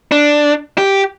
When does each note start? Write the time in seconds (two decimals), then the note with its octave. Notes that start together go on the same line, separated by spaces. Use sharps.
0.12 D4
0.78 G4